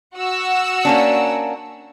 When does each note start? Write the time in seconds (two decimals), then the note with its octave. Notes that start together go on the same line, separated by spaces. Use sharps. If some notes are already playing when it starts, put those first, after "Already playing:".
0.17 F#4 F#5 E6
0.85 A#3 C#4 D4